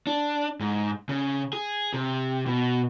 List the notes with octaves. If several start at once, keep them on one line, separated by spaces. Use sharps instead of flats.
D4
G#2
C#3
G#4
C3
B2